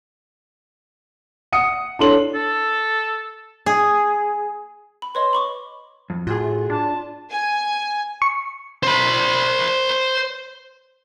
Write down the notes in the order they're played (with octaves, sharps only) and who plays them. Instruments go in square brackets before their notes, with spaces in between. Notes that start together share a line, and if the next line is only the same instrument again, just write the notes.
[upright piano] F#5 D#6 C#7
[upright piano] D4 C6 F#7 [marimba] E4 A4 C#5
[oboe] A4
[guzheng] G#4
[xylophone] B5
[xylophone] B4 C#5 D#5 [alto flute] C6
[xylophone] B5 C#6 D6
[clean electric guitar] F2
[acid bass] A2 [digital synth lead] F4 [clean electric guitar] F#4 G#4
[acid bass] D4 [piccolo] A5
[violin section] G#5
[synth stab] C#6
[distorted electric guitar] C5 B5